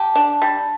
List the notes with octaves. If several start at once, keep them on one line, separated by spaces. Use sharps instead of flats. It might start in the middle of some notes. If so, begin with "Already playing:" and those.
Already playing: G4 A5
D4
G3